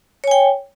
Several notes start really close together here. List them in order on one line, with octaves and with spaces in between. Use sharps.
C#5 G#5 G5